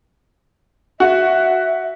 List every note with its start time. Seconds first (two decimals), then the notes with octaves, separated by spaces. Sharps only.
1.00 F#4 E5